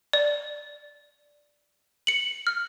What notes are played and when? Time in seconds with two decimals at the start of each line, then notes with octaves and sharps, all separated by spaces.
0.13 D5
2.07 C#7 F#7
2.47 F6